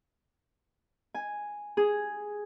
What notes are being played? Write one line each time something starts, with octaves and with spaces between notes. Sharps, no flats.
G#5
G#4